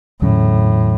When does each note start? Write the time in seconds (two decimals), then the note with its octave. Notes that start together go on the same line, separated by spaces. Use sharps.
0.21 E2 A2 D3 F#3 C#4